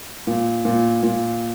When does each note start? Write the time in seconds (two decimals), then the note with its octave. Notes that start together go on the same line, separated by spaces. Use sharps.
0.27 A#2
0.65 A#2
1.03 A#2